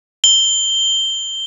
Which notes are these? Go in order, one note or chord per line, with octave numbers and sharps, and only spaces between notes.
G7